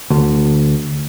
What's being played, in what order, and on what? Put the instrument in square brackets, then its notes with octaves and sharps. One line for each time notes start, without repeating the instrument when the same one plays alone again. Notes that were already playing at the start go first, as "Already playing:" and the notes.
[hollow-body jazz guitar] D2